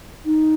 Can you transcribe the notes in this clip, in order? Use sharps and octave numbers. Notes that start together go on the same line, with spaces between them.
D#4